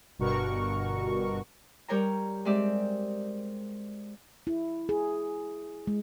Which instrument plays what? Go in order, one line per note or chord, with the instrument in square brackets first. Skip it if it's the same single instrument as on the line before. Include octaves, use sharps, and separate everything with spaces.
[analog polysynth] G1 G2 B2 F#4 A#4 C#6
[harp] G3 A#4 C#5 G5 A#5
G#3 C4 G4 D5 E5
[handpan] E4
G#4
G#3